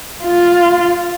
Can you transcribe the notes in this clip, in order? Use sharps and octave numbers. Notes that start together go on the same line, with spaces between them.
F4